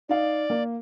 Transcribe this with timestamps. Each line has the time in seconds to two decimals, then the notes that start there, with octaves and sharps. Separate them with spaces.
0.09 D#4 D5 F5
0.50 A#3